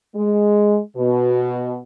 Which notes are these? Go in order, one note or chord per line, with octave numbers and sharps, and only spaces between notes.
G#3
B2